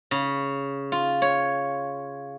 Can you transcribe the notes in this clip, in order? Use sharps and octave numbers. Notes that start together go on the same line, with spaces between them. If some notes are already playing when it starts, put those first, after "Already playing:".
C#3
F4
C#5